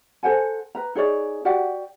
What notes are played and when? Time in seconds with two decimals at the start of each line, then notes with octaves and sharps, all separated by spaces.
0.23 A4 C5 F#5 G#5
0.75 B4 A#5
0.95 D#4 G#4 C#5 D5
1.45 F#4 G4 D5 F#5